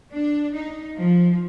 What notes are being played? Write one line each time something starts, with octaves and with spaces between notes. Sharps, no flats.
D4
D#4
F3